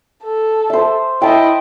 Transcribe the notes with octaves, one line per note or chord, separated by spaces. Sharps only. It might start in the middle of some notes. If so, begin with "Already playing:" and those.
A4
C5 E5
E4 D#5 G5 A5